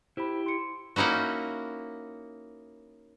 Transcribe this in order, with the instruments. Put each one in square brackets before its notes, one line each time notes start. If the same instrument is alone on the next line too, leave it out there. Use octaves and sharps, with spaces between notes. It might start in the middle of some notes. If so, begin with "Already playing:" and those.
[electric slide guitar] E4 G4 [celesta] C5 B5
[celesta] C6 C#7
[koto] A#3 C#4 D#4 E4 F#4